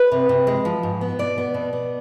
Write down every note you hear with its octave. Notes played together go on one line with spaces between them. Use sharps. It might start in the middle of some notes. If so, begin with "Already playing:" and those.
Already playing: B4
C3
C3
G#3
F3
G#2
B3
B2 D5
B3
B2
B3